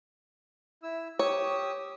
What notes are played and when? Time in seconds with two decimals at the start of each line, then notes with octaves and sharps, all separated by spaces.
0.83 E4 E6
1.19 G4 C#5 D#6 E6